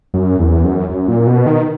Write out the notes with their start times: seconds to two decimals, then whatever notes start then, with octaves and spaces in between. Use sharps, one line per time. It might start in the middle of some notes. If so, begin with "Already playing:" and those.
0.14 F#2
0.39 E2
0.64 F#2
0.90 F#2
1.08 A#2
1.27 B2
1.46 D#3